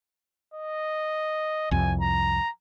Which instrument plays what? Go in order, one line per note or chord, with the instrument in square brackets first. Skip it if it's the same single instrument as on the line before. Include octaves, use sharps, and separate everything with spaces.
[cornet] D#5
[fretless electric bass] C2 F2 [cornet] G#5
[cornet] A#5